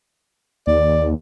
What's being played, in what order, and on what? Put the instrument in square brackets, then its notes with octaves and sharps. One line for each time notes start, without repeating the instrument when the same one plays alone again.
[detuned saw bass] D#2 [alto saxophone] D5